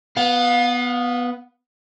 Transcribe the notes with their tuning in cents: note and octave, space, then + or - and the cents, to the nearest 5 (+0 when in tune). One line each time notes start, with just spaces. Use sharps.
B3 +0 F5 +35